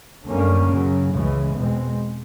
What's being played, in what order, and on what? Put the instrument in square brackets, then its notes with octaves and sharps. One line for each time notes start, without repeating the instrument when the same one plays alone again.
[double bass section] F#2 D3 G3 A#3 C#4
F#2 C#3 F#3
C#2 C#3 E3 G#3
E2 B2 G#3 C4